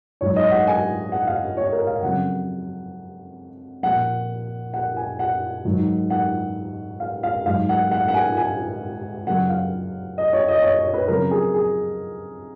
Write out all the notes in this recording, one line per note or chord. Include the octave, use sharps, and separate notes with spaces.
G#2 F#3 C#5
D#5
F#5
G#5
F#5
F5
C#5
A#4
F5
F2 C#3 F#3 F#5
A#2 F3 F#5
F#5
G#5
F#5
G#2 D#3 F#3
F#5
F5
F5
G#2 F#3 F5
F#5
F#5
F#5
G#5
G#5
F#2 C#3 F#3 F#5
F5
D#5
C#5
D#5
C#5
C#5
B4
F2 C#3 F#3 A#4
G#4
G#4